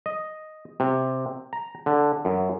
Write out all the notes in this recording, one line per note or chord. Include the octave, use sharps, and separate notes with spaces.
D#5
C3
A#5
D3
F#2